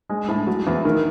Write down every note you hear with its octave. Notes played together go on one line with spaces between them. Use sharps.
G#3
A2
F#3
E2
D#3